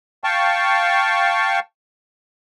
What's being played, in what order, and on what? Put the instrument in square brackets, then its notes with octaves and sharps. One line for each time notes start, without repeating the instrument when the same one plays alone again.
[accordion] F5 G5 A5 C#6